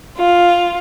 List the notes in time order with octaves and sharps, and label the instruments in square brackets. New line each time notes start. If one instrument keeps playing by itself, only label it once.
[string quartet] F4